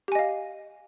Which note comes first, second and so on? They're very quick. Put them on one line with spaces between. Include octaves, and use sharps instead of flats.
G4 G#5 D#5 F5